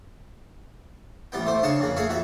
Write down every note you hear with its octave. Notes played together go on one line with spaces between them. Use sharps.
A1 G3 B3 G5
A3 C5 D6
C#3 D4 F5 A5 C#6 D#6
F2 C#3 A#3
A3 G#4 C#5 E5 F5
A#1 F2 F#4 E5